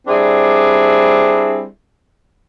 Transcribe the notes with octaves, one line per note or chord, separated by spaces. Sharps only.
G3 C4 D4 E4 G#4